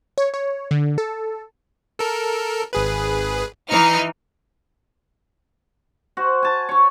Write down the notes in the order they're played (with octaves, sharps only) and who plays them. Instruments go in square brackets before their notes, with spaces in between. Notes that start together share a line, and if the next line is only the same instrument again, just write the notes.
[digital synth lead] C#5
C#5
D3
A4
[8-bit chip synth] A4 A#4
G#1 G#4 B4
[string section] E3 D#4 F6 [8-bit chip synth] C7 C#7
[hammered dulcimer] F#4 C5
G#5 A5
C#5 C#6